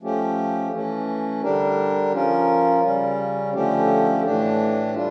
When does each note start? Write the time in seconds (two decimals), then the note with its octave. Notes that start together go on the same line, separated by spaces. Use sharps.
0.01 F3 A3 C#4 G4
0.71 E3 A3 C#4
1.43 D3 G3 D4 G4 A#4
2.12 F3 C#4 F4 A#4
2.83 C#3 G3 C#4
3.54 D3 F3 A3 C#4 G4
4.24 A2 E3 A3 D4 G4
4.94 G3 D4 F4